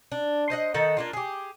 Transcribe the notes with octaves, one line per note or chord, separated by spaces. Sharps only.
D4
C5 D#5 F#5
D#3 D#4 A4 F#5
A#3 D4 F4
G4 G#4